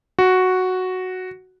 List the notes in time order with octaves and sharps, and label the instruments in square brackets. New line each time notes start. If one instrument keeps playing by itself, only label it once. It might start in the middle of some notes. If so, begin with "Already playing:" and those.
[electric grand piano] F#4